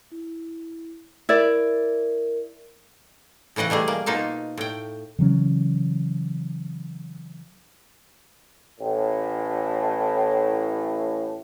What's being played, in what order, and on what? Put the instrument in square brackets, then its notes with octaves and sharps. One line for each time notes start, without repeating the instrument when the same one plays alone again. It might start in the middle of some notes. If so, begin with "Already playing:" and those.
[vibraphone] E4
[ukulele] E4 D5 [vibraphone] A#4
[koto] A2 C#3 E3 D#5 F#5
B2 G3 A3 G#4
A#3
B2 A#3 D#4 F4 A5
A2 G5
[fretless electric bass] C#3 E3 F#3 C#4
[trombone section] A1 A2